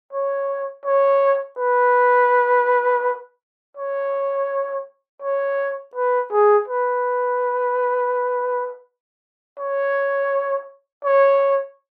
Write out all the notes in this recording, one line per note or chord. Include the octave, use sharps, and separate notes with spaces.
C#5
C#5
B4
C#5
C#5
B4
G#4
B4
C#5
C#5